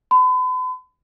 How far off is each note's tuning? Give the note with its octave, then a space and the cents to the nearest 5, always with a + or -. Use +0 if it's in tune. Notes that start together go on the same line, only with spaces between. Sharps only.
B5 +40